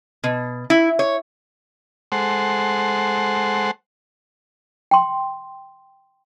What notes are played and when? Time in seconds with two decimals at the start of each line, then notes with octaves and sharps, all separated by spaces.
0.24 B2
0.70 E4
0.99 C#5
2.12 G#3 A4 C5 F#5
4.91 G5 C6